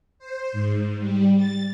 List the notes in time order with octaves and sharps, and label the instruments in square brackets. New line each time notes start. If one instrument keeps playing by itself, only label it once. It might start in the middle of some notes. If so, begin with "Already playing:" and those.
[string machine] C5
G#2
G3
A6